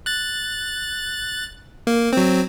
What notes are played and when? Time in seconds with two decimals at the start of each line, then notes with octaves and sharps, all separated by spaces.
0.06 F#6 A6
1.87 A#3
2.13 F#3 C4